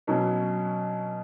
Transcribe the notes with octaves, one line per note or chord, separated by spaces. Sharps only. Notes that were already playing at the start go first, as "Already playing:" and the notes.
B2 F#3 C#4